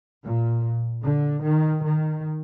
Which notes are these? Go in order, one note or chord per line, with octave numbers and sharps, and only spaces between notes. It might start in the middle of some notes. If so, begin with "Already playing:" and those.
A#2
D3
D#3
D#3